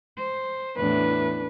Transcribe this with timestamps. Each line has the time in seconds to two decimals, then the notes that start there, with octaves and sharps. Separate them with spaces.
0.16 C5
0.77 E2 A2 D4 B4